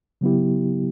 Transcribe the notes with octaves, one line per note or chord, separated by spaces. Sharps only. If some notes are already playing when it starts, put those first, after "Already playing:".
C#3 F#3 B3 E4 G4